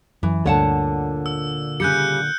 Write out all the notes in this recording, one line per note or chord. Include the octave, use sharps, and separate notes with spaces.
F#2 E3
D2 G2 A#2 D3 C#5 F#5 A5
E6
C#3 G3 F#6 G6 C#7